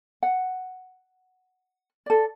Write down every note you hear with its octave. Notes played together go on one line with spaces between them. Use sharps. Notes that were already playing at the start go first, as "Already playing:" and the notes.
F#5
A4 D5